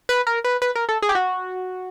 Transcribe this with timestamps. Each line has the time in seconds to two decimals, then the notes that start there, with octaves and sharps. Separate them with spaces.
0.09 B4
0.27 A#4
0.44 B4
0.62 B4
0.75 A#4
0.89 A4
1.02 G#4
1.09 G4
1.15 F#4